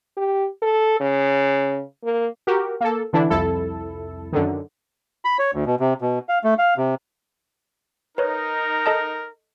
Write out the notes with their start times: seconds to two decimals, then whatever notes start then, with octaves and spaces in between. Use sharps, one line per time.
0.17 G4
0.62 A4
1.00 C#3
2.04 A#3
2.47 F#4 G4 A#4
2.81 A#3 A4
3.13 D3 E3 D4 E4
3.30 C2 F2 E4 A4
4.32 F#2 D3 D#3
5.25 B5
5.39 C#5
5.54 D2
5.66 B2
5.80 C3
6.01 B2
6.29 F5
6.44 A3
6.58 F5
6.77 C3
8.18 D#4 A#4 B4 C#5
8.86 A4 D#5 A5